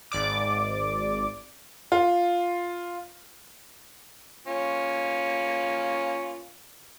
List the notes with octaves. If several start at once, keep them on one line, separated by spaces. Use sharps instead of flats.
G#1 D5 D6
F4
A#3 C#4 F4